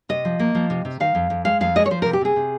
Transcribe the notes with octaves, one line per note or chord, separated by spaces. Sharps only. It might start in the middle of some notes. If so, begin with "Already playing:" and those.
C3 D#5
F3
A#3
F3
C3
C3
D#3 F5
F2
F2
G#3 F5
F2 F5
G#3 D#5
C#5
F3 C5
C3 A#4
G4
C3 G#4
C3